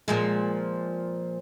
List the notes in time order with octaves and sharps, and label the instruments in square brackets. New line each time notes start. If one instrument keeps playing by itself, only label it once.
[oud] A#2 F3 G#3